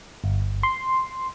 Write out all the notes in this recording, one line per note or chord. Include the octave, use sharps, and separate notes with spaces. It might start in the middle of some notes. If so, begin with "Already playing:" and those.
G1
C6